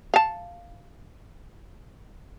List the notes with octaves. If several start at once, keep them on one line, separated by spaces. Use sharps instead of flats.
F5 A5